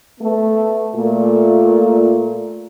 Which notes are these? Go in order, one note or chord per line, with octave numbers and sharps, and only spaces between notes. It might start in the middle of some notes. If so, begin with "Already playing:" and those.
A3 B3
A#2 A3